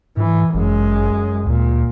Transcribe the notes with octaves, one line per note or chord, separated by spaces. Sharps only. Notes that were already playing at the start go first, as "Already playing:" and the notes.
G#2 E3
G1 F#2 G#3
D2 A#2